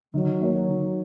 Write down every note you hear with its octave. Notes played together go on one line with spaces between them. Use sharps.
D#3 F#3
A#3 F#4 A#4 C#5
D#3